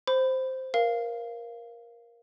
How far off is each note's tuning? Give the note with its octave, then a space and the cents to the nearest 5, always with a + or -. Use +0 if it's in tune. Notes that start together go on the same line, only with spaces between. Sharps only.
C5 +0 B5 +20
A#4 +15 F5 -10